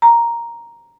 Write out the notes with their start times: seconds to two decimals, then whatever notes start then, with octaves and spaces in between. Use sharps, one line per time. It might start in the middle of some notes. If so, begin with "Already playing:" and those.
0.02 A#5